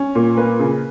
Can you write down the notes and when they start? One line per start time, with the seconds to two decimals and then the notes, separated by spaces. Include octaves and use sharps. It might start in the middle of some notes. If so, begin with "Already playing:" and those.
Already playing: C#4
0.15 A#2
0.37 A#3 B4
0.59 C#3